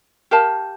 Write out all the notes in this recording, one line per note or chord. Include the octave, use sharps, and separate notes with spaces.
G4 A#4 F5 A5